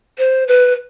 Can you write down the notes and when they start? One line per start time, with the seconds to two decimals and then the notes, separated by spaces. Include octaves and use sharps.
0.18 C5
0.48 B4